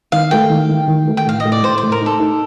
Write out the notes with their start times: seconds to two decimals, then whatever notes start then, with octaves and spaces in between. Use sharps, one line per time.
0.12 D#3 F5
0.31 A3 G5
0.50 D#3
0.69 D#3
0.88 D#3
1.08 A3
1.17 G5
1.26 A2 F5
1.40 D#5
1.45 A2
1.52 D5
1.63 A2 C5
1.78 C5
1.83 A2
1.92 A#4
2.01 D#4
2.06 A4
2.20 D#4